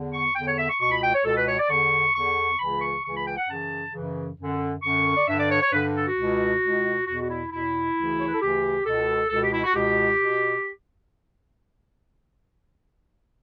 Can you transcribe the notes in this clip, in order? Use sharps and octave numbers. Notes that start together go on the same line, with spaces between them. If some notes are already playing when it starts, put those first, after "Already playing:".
Already playing: E2 D3
C#6
E2 D3 G5
C#5
E5
C#6
C#2 B2 C#6
B5
G5
C#5
C#2 B2 A4
B4
C#5
D5
E2 D3 C#6
E2 D3 C#6
C#2 C#3 E3 B5
C#6
C#2 C#3 E3 C#6
B5
G5
F#5
F#2 C#3 E3 A5
F#2 C#3 E3
F#2 D3
F#2 D3 C#6
D5
G2 D3 E5
D5
C#5
C#5
G2 D3 B4
A4
F#4
C#2 B2
C#2 B2
E2 B2 F#4
F#4
E4
E2 B2 E4
D2 C#3 E3
C#5
B4
A4
D2 C#3 E3 G4
C#2 B2 A4
C#2 B2 A4
G4
E4
F#4
C#2 B2 G4
B2